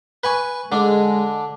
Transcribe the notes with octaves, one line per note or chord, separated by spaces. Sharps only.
B4 G#5 C#6
D3 G#3 D4